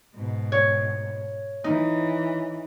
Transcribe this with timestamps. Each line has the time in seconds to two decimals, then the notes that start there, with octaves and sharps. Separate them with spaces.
0.15 G#2 B2
0.52 C#5
1.64 E3 D#4